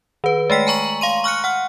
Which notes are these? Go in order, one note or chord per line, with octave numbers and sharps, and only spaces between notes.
D#3 B4
G#3 A3 G5 B6
G#5 A#5 C#6 F#7
F5 C6 D#7
C#6 F6 F#6 C#7
F#5 F6